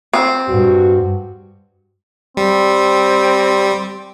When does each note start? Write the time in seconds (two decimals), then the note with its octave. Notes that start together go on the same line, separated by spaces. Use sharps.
0.14 C4
0.48 G2 F#4
2.37 G3 C4